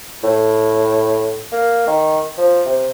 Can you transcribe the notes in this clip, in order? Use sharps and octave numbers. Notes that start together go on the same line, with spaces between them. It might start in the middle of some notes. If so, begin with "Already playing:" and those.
A2
A#3
D#3
F3
C3